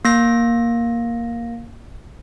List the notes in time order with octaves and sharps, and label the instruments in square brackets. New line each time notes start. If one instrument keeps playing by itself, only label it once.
[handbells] A#3 A#6